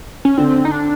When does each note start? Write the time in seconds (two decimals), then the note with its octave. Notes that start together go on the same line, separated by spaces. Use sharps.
0.25 C#4
0.37 D3 C4
0.65 D#4
0.71 D4